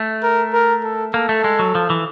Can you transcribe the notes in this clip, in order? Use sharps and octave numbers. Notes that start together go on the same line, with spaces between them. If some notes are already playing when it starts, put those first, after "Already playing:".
Already playing: A3
A#4
A#4
A4
A#3 A4
A3
G#3
F#3
F3
E3